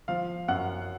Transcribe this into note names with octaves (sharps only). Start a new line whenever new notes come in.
F3 F5
F#2 F#5